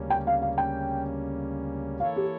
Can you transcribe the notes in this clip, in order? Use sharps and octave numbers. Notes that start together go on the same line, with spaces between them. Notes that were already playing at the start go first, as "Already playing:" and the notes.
Already playing: D2 C#3 G3 A#3 C#4
G5
F5
F5
G5
E3 A#3 E4 A4 C#5 F5
G4